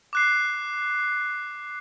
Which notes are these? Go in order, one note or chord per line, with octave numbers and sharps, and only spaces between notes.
D6 F#6 C7